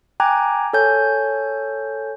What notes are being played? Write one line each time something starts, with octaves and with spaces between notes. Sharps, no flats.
G5 G#5 A#5 D6 F#6 G#6
A4 C#5 G#5 G6